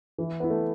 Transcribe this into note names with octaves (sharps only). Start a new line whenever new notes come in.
E3
B3 E4
A3